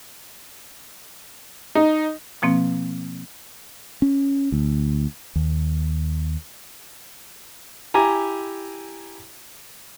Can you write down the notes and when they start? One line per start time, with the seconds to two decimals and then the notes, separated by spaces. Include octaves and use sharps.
1.75 D#4
2.42 B2 F3 A#3 C4
4.02 C#4
4.52 D2
5.36 D#2
7.94 E4 G4 G#5 A#5